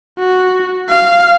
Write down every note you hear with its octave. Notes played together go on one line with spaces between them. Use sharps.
F#4
F5